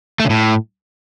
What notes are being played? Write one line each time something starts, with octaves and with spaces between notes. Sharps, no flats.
A3
C#3
A2